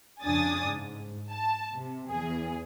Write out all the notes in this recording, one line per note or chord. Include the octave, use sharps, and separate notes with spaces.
F2 C#3 D4 G#5 D#6 A6
G#2
A5
C3
E2 G#4